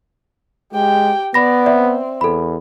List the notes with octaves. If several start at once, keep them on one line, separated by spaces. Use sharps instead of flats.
G#3 G4 G5
B3 D5 B5 A#6
C4 D5 E5
E2 A4 B5